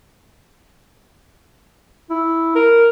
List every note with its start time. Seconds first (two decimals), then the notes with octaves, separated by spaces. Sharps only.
2.10 E4
2.55 A#4